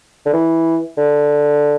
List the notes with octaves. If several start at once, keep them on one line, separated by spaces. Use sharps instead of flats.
D3
E3
D3